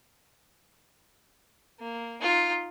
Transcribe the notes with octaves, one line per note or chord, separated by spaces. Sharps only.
A#3
D#4 F4